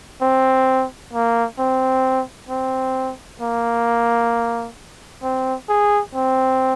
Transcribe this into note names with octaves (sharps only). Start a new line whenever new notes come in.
C4
A#3
C4
C4
A#3
C4
G#4
C4